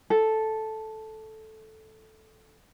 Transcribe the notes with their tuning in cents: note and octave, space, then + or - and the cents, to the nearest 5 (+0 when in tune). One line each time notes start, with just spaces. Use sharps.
A4 -5